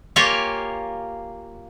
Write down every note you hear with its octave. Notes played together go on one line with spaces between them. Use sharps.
A#3 F4 G4 A#4 C#5 G#5